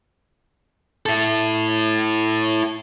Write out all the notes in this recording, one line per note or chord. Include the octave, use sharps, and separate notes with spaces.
E4 A4